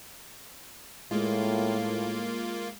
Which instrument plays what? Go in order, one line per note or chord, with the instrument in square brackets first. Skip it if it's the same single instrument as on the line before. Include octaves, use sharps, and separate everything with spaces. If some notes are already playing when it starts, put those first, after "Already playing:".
[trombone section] A2 [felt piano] G#3 [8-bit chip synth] A#3 F4